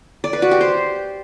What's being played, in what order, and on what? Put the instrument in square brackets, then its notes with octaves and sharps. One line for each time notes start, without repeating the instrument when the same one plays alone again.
[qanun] D5
B4
F#4
G4
C5